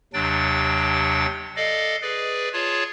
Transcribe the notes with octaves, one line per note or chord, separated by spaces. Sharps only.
D#2 C3 F#3 D4 G5 A6
A4 D5 D#5 F5
G#4 B4 D5
F4 G#4 C#5 A5